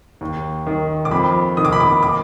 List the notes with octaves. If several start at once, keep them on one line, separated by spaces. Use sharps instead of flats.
D#2
D#3
D6
F2 B5
D#3 D#6
D6
B5
D6
D6